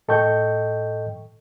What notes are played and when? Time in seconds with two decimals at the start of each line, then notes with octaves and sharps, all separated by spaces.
0.08 A2 A4 D#5 G5 C#6 G6